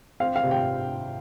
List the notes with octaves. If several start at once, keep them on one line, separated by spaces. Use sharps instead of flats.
C4 F5
F5
C3
G5